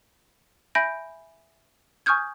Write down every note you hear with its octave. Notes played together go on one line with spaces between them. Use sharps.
E5 G#5 B5 G6 A#6 D7
G#5 C#6 D#6 F6 G6 G#6